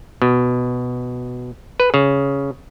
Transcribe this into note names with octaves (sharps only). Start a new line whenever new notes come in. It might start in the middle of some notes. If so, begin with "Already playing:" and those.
B2
B4
C#3